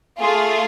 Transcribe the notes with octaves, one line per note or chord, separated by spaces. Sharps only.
A3 F4 G#4